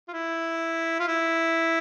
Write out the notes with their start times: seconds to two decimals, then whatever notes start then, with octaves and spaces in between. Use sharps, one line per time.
0.08 F4
0.13 E4
1.00 F4
1.08 E4